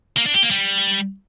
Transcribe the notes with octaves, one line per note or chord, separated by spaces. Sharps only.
A#3
D4
G4
A#3
G3